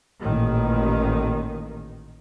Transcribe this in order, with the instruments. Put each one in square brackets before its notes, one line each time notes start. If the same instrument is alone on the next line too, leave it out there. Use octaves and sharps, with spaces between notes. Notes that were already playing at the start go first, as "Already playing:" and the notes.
[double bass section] A1 A#2 D#3